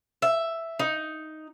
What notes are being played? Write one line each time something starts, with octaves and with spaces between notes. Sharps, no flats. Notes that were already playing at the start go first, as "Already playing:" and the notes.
E5
D#4